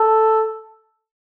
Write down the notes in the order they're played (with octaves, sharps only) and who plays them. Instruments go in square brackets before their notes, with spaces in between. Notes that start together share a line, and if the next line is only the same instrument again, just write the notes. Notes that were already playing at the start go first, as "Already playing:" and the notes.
Already playing: [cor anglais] A4